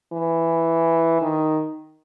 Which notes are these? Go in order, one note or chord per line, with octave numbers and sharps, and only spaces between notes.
E3
D#3